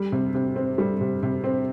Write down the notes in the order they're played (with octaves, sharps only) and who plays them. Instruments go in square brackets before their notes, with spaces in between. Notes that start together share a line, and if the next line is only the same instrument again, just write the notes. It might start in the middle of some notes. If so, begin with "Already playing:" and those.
Already playing: [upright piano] G3
C3
C3
C4
G3
C3
C3
C4